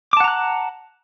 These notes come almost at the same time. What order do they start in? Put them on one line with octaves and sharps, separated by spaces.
D6 A5 F#5 A#5 F#6